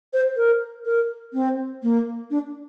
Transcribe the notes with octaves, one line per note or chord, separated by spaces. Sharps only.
C5
A#4
A#4
C4
A#3
D4